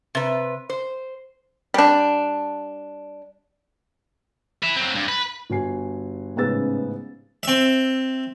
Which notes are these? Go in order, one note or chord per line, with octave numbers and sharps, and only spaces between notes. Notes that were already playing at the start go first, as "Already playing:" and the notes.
C3 B4
C5
G3 D4
B4 E5
F#3 C4
G2
B4
G1 F#4 G#5 C7
A1 G#2 C#3 B3 E6 A6
C4 E5